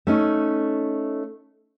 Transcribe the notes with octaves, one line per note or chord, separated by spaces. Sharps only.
A3 C#4 D#4